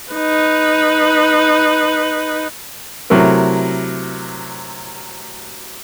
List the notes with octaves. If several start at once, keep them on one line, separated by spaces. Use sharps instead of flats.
D#4 B4
C3 F#3 A3 E4 A#4